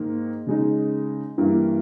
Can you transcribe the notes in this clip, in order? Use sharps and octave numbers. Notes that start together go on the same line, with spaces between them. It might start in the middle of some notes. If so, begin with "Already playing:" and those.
Already playing: G#2 D#3 A#3
C#3 G#3 D#4
G2 E3 A#3 E4